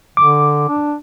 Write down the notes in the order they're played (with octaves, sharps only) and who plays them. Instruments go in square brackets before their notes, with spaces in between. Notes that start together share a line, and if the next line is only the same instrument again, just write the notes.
[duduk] D3 [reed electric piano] D6
[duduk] D4